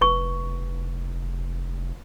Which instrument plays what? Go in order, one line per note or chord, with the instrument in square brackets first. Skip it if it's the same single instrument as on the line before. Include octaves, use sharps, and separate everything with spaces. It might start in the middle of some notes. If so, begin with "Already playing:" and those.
[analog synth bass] F1 [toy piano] B4 C#6